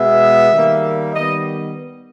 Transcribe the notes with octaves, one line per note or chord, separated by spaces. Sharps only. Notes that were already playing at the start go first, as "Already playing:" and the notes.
Already playing: B2 G#3 B3 E5
D#3 G3 A#3
D#3 G3 B3 D#5